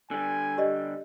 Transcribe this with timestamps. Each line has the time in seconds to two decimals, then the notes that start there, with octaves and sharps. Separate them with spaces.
0.11 D3 G3 G#5
0.58 G4 D5 D#5